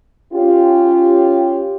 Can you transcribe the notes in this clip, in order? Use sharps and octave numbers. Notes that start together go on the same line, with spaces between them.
C#4 F4 G4